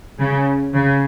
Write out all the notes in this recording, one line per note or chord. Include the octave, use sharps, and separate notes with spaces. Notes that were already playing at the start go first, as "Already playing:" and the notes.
C#3
C#3